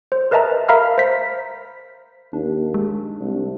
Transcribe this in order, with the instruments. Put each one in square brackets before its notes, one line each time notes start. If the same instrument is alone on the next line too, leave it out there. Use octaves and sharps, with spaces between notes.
[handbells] C5
A#4 B4 D#5 E5 A5 A#5
A#4 E5 F5 A#5 B5 F6
C5 B6
[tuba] D#2 [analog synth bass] D4
[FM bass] G#3
[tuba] C2